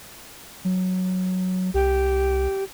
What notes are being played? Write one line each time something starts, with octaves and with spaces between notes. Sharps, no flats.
F#3
C2 G4